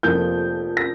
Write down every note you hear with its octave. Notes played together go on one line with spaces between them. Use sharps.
F1 F2 F3 A#3 G6
A#6